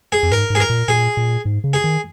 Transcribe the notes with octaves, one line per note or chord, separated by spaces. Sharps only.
G#4
F2
G#2 A#4
G#2
G#4
A#4
A#2
A#2 G#4
A#2
G#2
C#3
G#4
D#3